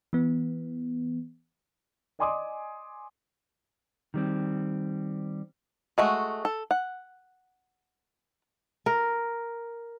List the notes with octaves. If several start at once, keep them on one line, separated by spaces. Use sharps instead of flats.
E3 B3
D5 D#5 G#5 C6 D6 D#6
D#3 G3 C4
G#3 A3 F#4
A4
F#5
A#4